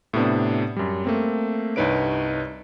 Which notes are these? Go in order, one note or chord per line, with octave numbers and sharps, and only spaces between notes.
A2 C3 B3 D4
F#2 G3
A3 A#3 C4
C2 G2 D#4 B4 C#5 D7